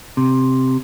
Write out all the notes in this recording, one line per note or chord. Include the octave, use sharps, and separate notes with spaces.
C3